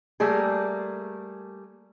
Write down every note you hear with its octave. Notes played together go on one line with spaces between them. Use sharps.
G3 A3 A#3 G#4